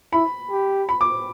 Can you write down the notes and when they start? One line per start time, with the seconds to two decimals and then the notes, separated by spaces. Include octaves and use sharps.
0.13 E4 B5
0.51 G4
0.89 B5
1.01 D6